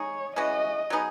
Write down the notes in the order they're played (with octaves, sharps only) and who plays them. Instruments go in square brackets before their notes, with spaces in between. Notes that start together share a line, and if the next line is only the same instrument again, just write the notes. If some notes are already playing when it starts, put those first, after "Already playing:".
Already playing: [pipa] G#3 D#4 G#4 [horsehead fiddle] C#5
[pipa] E3 G#3 C#4 F#4 [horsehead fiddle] D#5
[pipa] F#3 B3 D#4 G#4